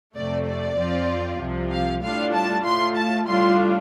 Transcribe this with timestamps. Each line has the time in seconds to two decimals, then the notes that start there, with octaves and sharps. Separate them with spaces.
0.16 F2 C3 A3 D5
0.47 D5
0.78 F2 F3 C4 F4
1.40 C2 C3 F3
1.71 F5
2.02 A2 G3 D4 F4 F5
2.33 A5
2.65 A2 A3 F4 C6
2.96 A5
3.27 A2 G3 D4 F4 C6